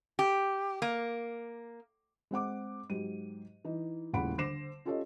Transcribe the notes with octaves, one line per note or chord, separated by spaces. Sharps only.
G4
A#3
G#3 C4 F#5 D6
G#2 F#3 G4 D#7
E3 D#4
D#1 A2 C#3 F#5 B5 D7
D3 C5 D6 A#6 C7 E7
C#4 F4 G4 A4 C#5 D#5